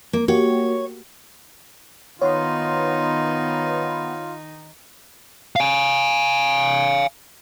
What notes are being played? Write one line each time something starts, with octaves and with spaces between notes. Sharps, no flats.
A#3
A#3 F#4 G4 C#5
D#3 B3 D#4 F4 C#5 C6
F5 G#5